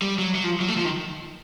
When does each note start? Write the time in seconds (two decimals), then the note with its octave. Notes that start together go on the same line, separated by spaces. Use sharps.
0.02 G3
0.18 F#3
0.35 F#3
0.43 F3
0.60 F#3
0.68 A3
0.77 F3
0.85 D#3